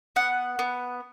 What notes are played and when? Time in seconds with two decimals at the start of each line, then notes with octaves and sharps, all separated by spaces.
0.16 B3 F#5
0.59 B3